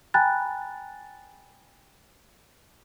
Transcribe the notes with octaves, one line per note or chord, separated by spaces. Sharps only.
G5 G#5 A#5 B5 F#6 A6